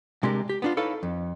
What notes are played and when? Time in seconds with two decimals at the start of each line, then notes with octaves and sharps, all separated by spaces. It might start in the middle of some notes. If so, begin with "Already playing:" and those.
0.23 C3 G#3 D4 G4 A#4
0.49 G4
0.62 B3 D4 F4
0.77 D#4 E4 A4 B4 C#5 F5
1.03 F2